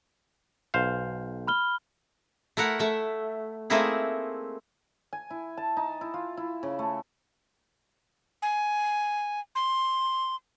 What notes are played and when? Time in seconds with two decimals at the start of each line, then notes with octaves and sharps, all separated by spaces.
0.74 B1 C5 F5
1.48 B5 F6 G7
2.57 A3 E4 A#4 F#5
2.79 A3 E5
3.70 A3 A#3 C4 D#4 E4 G#4
5.13 G#5
5.30 E4
5.57 A5
5.77 D#4
6.01 E4
6.14 F4
6.37 E4
6.63 C#3
6.79 A3
8.42 G#5
9.55 C6